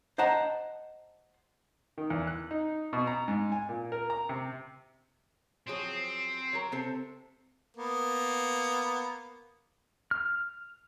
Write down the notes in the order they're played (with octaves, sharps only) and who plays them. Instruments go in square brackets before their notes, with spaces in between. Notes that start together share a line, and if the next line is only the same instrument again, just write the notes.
[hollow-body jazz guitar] C5 D#5 F#5 A5 A#5
[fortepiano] D#3
E2
F#6
D#4
B2
A#5
G#2
G#5
A#2
A#4
A#5
C3
[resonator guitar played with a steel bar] F3 F#3 G#4 [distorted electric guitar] C4
[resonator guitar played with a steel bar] F#3 A#4
C3 C4 A4
[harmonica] A#3 B3
[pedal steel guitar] F6